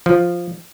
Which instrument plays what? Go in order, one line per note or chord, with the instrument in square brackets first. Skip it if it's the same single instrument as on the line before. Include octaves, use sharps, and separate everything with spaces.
[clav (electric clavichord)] F3